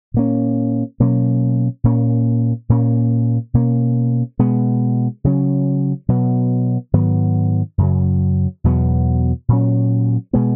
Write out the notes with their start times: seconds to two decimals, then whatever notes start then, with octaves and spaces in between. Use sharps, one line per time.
0.14 A#2 A#3 C#4
1.00 B2 F#3 A#3 C#4
1.84 A#2 A#3 C#4
2.69 A#2 A#3 C#4
3.54 B2 A#3 C#4
4.39 B2 G#3 B3
5.24 C#3 F#3 C#4
6.09 B2 F#3 B3
6.93 G#2 D#3 F#3 B3
7.78 F#2 C#3 F#3
8.64 E2 B2 F#3 B3
9.49 A#2 F#3 C#4
10.33 B2 G#3 B3